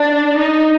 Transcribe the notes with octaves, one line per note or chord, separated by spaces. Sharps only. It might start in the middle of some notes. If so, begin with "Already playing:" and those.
Already playing: D4
D#4